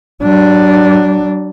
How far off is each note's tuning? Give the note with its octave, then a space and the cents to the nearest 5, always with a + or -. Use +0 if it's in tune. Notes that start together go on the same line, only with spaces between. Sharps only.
F#3 +30 D4 +0